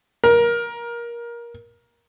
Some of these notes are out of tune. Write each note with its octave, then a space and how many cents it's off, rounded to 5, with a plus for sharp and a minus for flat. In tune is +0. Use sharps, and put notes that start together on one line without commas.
A#4 +20